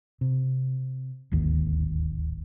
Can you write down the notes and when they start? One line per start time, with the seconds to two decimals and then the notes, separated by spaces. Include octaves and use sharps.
0.21 C3
1.32 D1 G#1 D#2 D#3